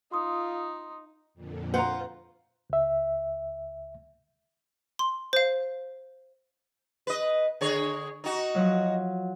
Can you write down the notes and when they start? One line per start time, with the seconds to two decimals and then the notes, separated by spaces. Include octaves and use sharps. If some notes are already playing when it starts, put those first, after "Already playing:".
0.12 D#4 F4 C6 D#6
1.34 F2 A#2 D3
1.74 F4 C5 F#5 A#5
2.70 C#2 E5
4.99 C6
5.33 C5 F5
7.07 B4 D#5
7.61 D3 G#4 C#5
8.24 D#4 F#4
8.55 F3 F#3